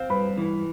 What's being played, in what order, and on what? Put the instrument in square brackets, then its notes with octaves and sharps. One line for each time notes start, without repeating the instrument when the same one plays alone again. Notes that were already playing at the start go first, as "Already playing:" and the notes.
Already playing: [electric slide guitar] C4 [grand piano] F5
[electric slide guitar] G2 [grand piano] B4 B5
[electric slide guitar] E3